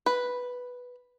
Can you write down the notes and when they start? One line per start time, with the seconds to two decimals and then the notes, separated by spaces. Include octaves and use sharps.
0.06 B4